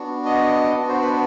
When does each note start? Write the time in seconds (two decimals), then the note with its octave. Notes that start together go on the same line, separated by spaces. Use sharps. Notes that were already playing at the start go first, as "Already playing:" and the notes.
Already playing: B3 D4 F#4
0.25 D#5
0.76 B3 D4 F#4
0.89 C5
1.02 B4